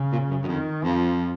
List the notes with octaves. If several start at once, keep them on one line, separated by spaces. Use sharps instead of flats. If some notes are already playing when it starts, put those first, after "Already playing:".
Already playing: C#3
A#2
F#2
F#2
F2 D#3
F2 F3